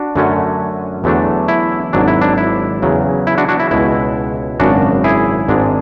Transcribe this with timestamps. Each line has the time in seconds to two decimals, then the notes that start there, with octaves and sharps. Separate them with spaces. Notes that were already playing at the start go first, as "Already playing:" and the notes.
Already playing: D4 F#4
0.16 F#2 D3 F#3 A3 C#4
1.04 E2 D3 F#3 A3 D4
1.48 E4
1.93 G#1 G#2 F#3 D4
2.08 E4
2.21 D4
2.38 E4
2.82 E2 C#3 F#3
3.27 E4
3.38 D4 F#4
3.49 D4 F#4
3.60 E4
3.71 C#2 B2 G#3 E4
4.60 G#1 F#2 C#3 D4 F#4
5.04 E4 G#4
5.48 G#1 G#2 G#3 D4